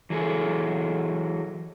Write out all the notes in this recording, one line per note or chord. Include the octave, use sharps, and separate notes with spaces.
E3 F#3 G#4 A4